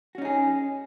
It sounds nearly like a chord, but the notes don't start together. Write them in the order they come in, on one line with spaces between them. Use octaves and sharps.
F#4 C#4 D#4 G#4